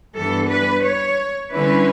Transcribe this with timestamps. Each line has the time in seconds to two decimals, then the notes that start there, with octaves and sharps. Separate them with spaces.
0.16 G2 E3 B3 D4 A4
0.51 B4
0.85 C#5
1.53 D3 G3 C#4 E4 B4